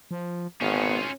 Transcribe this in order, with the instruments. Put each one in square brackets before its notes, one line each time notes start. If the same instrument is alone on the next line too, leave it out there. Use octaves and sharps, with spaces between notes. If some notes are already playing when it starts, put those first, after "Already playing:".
[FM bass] F3
[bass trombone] G#1 [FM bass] B3 [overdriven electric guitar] C#4 F4